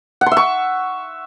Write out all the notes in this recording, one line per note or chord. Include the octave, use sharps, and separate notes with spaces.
F#5
C6
E5
C#6